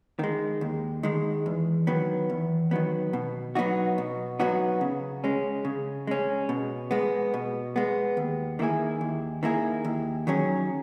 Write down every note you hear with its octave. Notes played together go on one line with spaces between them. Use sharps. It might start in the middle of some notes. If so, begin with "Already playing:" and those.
D#3 G#3
D#2
D#3 G#3
E2
D#3 F#3 B3
E2
D#3 F#3 B3
B2
F#3 B3 D#4 F#4
B2
F#3 B3 D#4 F#4
C#3
G#3 C#4
C#3
G#3 C#4
B2
G#3 B3
B2
G#3 B3
D#2
D#3 A#3 E4 G#4
D#2
D#3 A#3 E4 G#4
D#2
D#3 F#3 C#4 G#4